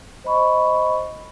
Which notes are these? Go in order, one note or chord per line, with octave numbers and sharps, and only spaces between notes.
C5 D#5 B5 C#6